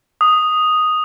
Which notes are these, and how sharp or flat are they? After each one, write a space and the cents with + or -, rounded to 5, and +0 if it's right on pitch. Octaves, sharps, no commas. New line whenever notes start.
D#6 +0